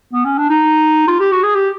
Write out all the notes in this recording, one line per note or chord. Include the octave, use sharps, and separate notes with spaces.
B3
C#4
D4
D#4
F4
G4
F#4
G#4
G4